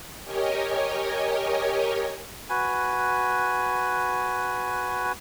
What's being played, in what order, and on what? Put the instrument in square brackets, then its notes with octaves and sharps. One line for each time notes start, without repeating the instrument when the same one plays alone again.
[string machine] G4 A#4 C#5 D#5 G#5
[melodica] F#4 B4 G#5